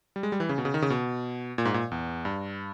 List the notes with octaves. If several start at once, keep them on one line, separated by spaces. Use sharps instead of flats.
G3
G#3
G3
E3
C#3
B2
C#3
D#3
C#3
B2
A#2
G#2
A#2
E2
G2